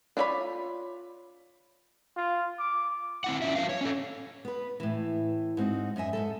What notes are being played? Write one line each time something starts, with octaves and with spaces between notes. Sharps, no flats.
D4 F4 C#5 D5 B5
F4
D6
C4 E4 F#5
C#4 F4 E5
F#3 G#4 B4 F5
C#5
C#4 A4
B3 B4
A2 E3
G#2 C4 D#4 F#4
F#2 D#5 E5 G#5
G#2 C#3 A4